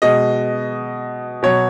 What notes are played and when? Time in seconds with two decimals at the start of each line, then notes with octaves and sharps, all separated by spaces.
0.02 B2 G#3 D#5
1.43 B2 F#3 C#5